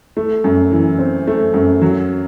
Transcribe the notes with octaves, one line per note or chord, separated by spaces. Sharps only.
A3
F#2
E3
C4
A3
F#2
F#3